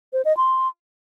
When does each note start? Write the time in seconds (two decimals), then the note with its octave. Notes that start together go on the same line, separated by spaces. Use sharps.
0.13 C5
0.25 D#5
0.37 C6